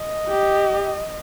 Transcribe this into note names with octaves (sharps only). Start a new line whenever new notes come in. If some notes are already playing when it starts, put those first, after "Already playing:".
Already playing: D#5
G4